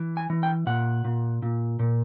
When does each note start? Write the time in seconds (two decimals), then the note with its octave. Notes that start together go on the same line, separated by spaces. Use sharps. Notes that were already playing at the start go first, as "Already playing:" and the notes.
Already playing: E3
0.17 G#5
0.30 E3
0.43 G5
0.66 A#2 F#5
1.04 A#2
1.42 A#2
1.79 A#2